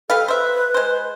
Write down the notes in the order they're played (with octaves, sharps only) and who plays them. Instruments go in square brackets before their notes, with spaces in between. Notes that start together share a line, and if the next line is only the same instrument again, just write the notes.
[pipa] G3 B4 F5 [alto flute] A4
[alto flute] B4 [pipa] C5 E5
[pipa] G#3 C5